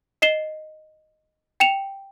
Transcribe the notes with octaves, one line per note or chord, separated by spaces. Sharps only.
D#5 C7 E7 G7
G5 C#7 E7 F7